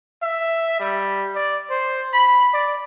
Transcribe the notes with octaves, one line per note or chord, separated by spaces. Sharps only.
E5
G3
D5
C5
B5
D5